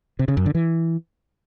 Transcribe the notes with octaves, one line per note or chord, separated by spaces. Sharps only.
C3
C#3
F#2
D3
E3